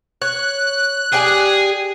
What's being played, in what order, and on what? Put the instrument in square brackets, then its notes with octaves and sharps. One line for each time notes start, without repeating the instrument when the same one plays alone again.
[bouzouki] C#5 [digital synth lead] F#6
[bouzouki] G4 D5 G#5 [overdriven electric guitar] G#4